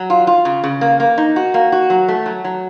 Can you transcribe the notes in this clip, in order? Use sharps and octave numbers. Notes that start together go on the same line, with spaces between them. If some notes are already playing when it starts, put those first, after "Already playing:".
Already playing: F#3
F4
F4
C#3
C#3
A#3
A#3
D#4
F#4
A#3
F#4
F#3
A3
F#3
F#3